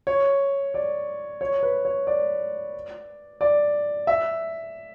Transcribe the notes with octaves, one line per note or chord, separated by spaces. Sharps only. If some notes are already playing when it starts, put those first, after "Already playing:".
C#5
D5
C#5
B4
C#5
D5
D5
E5